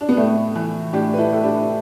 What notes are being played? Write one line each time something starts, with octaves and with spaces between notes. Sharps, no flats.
D4
B3
A2 A3
E3
A2 D4 G4
B4
E4 A4
A2 A4
D4 G4